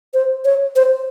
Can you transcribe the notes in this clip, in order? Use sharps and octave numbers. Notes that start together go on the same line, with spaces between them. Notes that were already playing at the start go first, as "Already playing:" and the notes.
C5
C#5
C5